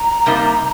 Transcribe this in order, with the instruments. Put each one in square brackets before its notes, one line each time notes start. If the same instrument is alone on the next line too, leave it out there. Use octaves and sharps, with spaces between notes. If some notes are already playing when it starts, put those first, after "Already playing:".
Already playing: [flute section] A#5
[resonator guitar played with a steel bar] C3 G3 A#3 D#4